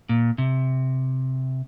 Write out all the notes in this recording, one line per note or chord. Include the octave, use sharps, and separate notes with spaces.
A#2
C3